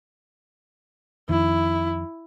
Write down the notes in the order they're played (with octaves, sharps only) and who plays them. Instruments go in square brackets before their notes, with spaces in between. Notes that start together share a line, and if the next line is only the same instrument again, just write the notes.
[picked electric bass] F2 D#3 [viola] E4